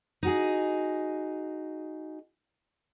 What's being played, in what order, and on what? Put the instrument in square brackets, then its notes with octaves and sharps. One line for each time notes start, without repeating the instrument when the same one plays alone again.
[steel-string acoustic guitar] D#4 F#4 G#4